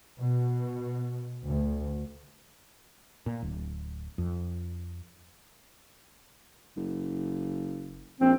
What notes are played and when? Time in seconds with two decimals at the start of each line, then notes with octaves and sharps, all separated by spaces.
0.18 B2
1.46 D2
3.26 A#2
3.42 D1
4.18 F2
6.77 F#1
8.21 A#1 C4